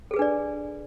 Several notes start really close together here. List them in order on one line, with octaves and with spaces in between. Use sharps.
A4 G#4 B4 D4 D5